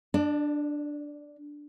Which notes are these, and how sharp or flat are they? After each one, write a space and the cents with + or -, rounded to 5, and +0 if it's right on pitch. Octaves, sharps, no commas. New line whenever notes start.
D4 +0 D5 +40